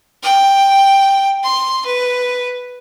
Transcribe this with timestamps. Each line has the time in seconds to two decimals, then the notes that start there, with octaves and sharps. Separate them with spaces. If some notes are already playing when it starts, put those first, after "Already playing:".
0.23 G5
1.44 C6
1.86 B4